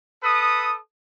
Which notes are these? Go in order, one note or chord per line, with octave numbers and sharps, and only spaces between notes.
A4 B4 D#6